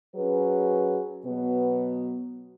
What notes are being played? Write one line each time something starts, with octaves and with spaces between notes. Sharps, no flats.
F#3 C#4 G#4 B4
B2 F#3 B3